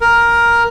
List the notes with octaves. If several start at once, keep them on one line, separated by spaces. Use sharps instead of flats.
A#4